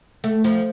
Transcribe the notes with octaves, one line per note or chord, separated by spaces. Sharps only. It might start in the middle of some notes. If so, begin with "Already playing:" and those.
A3
F3